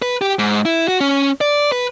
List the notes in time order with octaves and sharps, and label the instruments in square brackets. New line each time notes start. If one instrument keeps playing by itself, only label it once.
[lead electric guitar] B4
G4
G#2
E4
F#4
C#4
D5
B4